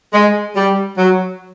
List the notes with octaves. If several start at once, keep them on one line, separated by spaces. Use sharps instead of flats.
G#3
G3
F#3